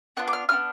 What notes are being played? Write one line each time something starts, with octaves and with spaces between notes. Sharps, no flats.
B3 D4 F4 F#6
D6
F6
B3 D4 F4 F6